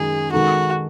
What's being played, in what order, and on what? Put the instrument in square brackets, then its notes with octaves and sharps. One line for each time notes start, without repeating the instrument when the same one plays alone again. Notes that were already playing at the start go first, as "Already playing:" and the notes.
Already playing: [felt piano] F#2 D#3 G#3 [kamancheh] G#4
[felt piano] D#3 G#3 D#4 A4 [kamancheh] F#4